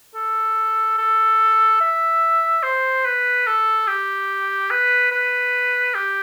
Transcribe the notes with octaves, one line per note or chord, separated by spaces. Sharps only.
A4
A4
E5
C5
B4
A4
G4
B4
B4
G4